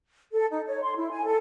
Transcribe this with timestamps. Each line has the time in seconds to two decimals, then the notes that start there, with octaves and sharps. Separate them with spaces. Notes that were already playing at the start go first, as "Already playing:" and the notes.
0.33 A4
0.51 D#4
0.66 C#5
0.82 C6
0.95 E4
1.10 G#5
1.26 A4